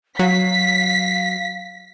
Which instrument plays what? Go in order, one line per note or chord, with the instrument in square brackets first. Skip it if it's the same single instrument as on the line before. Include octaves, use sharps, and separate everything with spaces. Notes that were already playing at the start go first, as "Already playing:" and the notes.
[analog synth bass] F#3 [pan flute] F5 [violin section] B6